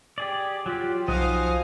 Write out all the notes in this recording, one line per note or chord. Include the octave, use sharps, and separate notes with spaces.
G4 G#4 D5
F#3 F4 G4
B1 F3 D#4 F#4 C5 F5 G#5 D#6